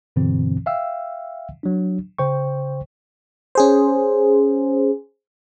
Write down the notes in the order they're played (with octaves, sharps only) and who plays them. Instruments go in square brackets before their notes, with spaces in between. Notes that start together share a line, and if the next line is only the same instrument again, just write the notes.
[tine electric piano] G2 B2 D3 E3 C4
E5 F5 G5 E6
F#3 D4
C#3 C5 G5 C#6
[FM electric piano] C#4 G#4 C5